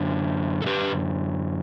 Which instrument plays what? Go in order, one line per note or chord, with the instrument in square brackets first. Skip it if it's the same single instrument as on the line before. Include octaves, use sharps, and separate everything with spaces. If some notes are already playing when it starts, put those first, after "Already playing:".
Already playing: [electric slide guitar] F#2 D3
A4
G4 B4